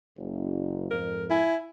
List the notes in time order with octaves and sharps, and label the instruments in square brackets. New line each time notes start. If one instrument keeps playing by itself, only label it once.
[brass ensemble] F#1
[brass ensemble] F2 G#2 [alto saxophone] A#4
[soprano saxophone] E4 [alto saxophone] G#5